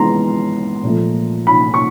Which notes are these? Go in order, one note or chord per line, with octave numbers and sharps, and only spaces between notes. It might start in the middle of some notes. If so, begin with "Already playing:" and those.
Already playing: E3 G#3 B3 A#5 C6
A#2 F3 A3
B5
C#6